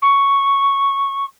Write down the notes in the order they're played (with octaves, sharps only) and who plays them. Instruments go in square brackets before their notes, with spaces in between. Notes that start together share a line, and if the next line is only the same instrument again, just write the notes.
[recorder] C#6